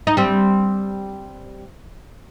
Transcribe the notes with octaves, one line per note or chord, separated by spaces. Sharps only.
D#4
G3 C4